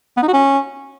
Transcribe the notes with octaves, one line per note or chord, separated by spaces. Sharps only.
B3
D#4
F#4
C#4